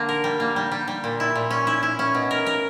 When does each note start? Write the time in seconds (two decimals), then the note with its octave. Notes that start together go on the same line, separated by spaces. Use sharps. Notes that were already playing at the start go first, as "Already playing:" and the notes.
Already playing: D3 A#3
0.09 A#4
0.24 G3
0.40 A#3
0.56 G3
0.72 G3
0.88 G3
1.04 A#2
1.20 E4
1.35 A#2
1.51 C#4
1.67 E4
1.83 E4
1.99 C#4
2.15 B2
2.31 A#4
2.46 A#4